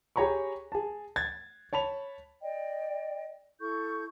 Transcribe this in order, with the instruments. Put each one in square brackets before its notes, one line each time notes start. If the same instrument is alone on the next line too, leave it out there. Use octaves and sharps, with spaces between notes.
[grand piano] G4 G#4 C#5 A#5 B5 C#6
G#4 A5
G#6 A6
C#5 A5 B5 F7
[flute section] D5 D#5 G5
E4 A4 C#6 G6